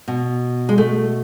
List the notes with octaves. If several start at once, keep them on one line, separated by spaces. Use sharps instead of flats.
B2
G#3
A3